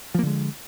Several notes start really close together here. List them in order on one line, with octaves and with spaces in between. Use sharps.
F3 A#3 D3 G#3